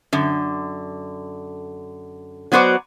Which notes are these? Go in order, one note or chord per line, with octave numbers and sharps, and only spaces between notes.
F#2 D3
F#3 B3 F#4 C5 D5